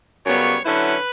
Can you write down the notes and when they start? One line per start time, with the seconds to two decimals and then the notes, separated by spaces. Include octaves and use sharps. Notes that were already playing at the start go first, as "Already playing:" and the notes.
0.25 F#2 C#3 G3 B3 C#5
0.64 D3 F#3 C#4 E4 B4